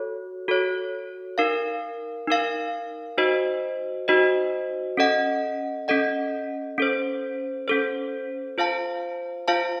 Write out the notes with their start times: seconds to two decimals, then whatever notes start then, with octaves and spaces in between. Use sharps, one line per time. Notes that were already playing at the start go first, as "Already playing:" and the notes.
Already playing: F#4 A4 C#5
0.48 F#4 A4 C#5
1.38 D#4 A#4 F5
2.28 D#4 A#4 F5
3.18 D#4 F#4 C5 D#5
4.08 D#4 F#4 C5 D#5
4.97 C#4 A4 D#5 F#5
5.88 C#4 A4 D#5 F#5
6.78 C#4 A4 C5
7.68 C#4 A4 C5
8.58 F4 C5 F5 A5
9.48 F4 C5 F5 A5